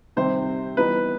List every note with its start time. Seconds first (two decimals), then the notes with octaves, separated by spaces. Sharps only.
0.16 C3 D#3 G3 C4 C5
0.77 E3 G3 B3 D#4 B4